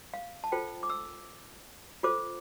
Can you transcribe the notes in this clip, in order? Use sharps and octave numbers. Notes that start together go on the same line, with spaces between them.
F5
A5
F4 A4 C5 G5
D6
E6
F4 A4 C5 D6